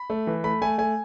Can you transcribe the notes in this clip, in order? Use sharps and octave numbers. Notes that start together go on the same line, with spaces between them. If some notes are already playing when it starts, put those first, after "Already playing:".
Already playing: B5
A3
E3
A3 B5
A3 G#5
A3 G#5